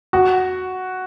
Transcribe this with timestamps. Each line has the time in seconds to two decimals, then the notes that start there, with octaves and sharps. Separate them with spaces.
0.13 F#4